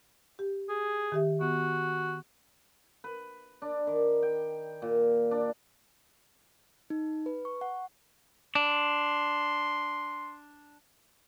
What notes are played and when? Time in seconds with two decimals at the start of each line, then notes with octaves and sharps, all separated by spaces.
0.39 G4
0.69 G#4
1.12 D#3 G4 E5
1.41 B3 F#4
3.04 B4
3.62 D4
3.87 D#3
4.22 G5
4.82 A#2
5.31 D4
6.90 D#4
7.26 B4
7.45 C#6
7.61 F#5
8.55 D4 C6